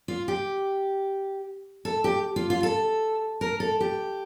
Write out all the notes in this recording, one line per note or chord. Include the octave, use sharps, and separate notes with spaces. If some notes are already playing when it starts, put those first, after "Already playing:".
F4
G4
A4
G4
F4
F4
A4
A#4
A4
G4